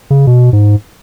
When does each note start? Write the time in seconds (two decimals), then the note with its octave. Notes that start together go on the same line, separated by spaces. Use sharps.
0.10 C#3
0.27 B2
0.53 G#2